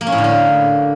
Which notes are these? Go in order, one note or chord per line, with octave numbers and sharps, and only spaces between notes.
A#3
C#4
A2
D3
A#3